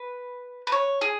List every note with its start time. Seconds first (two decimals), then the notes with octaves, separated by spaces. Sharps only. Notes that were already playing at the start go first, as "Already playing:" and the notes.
Already playing: B4
0.67 B4
0.72 C#5
1.01 G#4